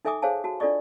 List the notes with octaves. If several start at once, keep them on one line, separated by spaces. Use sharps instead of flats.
D#4 A4 E5 G#5 D6 D#6
G#4 C5 C#5 F5 G#5 A5
F#4 A5
D4 F4 A4 D5 D#5 C#6